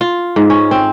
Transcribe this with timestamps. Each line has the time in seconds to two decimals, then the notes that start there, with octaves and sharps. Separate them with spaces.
0.01 F4
0.36 G#2
0.50 C#4
0.71 C4